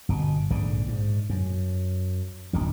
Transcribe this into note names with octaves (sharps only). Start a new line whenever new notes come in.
G1 B2
A#1 G#2 D3
G#2
F#2
D1 A#1 D#3